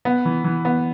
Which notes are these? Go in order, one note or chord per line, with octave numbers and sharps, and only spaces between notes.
B3
E3
E3
B3